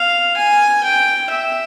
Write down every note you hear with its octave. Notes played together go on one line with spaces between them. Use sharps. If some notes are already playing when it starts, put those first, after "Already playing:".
Already playing: F5
G#5
G5
E5